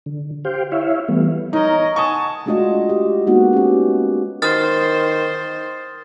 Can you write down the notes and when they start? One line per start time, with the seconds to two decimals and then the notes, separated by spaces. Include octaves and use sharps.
0.06 D3
0.45 G4 C5 F5 G5
0.72 E4 C#5 E5 F5
1.09 E3 G3 A3 B3
1.53 D#4 A#4 C#5 D#5
1.96 F#5 G#5 A5 C#6 D#6
2.46 G#3 A3 D4 F4 F#4 D#5
2.89 G4
3.27 G#3 A#3 B3 D#4 F#4
3.53 C#4 G4
4.42 D#3 C5 D#6 F6 A6